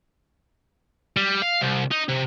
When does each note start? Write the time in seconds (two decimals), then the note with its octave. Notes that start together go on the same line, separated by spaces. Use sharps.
1.17 G3
1.42 F5
1.61 C2
1.91 D#4
2.08 C3